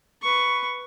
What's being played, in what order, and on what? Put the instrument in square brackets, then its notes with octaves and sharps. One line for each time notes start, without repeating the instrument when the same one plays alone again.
[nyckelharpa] B4 C#6